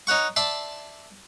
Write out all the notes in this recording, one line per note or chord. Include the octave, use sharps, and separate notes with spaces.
D#4 C#5 F#5 C#6
D5 E5 A5 C6